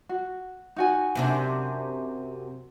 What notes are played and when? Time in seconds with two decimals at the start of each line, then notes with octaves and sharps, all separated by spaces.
0.09 F#4
0.76 D#4 F#4 G#5
1.15 F#2 C3 D4